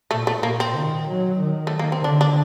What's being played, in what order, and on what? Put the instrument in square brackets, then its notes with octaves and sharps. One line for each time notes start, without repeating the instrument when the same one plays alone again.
[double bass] A#2 [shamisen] A3
[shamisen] A3
[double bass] A#2 [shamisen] A#3
[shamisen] C4
[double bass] D#3
F#3
D#3
[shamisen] A3
A#3
C4
[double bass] D3 [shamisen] D4
[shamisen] D4